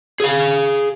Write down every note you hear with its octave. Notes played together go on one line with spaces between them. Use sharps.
G#4 F5